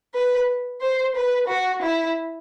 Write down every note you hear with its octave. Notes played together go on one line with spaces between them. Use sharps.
B4
C5
B4
F#4
E4